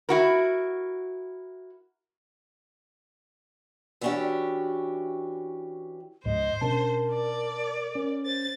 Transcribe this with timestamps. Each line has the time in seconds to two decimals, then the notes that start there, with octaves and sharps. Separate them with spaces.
0.09 E4 F#4 A#4
4.01 E3 B3 C#4 D4 F#4 G4
6.26 C#2 G#2 C5 D#5
6.61 B2 C#4 D4 A#4 A5
7.13 D5
7.95 C#4 A#4
8.25 C5 A6